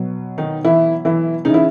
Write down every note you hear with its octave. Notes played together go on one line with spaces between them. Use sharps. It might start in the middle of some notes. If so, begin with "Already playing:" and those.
Already playing: B2 F#3
D#3 D#4
E3 E4
E3 E4
C#3 E3 D#4
E4